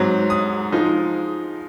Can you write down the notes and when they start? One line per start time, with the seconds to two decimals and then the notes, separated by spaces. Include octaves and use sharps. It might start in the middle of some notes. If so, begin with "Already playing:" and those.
Already playing: G#2 F#3 C4
0.30 D#6
0.72 F3 G#3 D#4